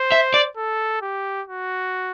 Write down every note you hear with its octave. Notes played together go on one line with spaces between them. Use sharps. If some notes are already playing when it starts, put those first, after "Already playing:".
Already playing: C5
E5
D5
A4
G4
F#4